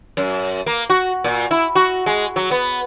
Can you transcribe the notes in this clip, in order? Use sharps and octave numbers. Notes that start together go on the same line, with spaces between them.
F#2
A#3
F#4
A#2
E4
F#4
G#3
F#3
B3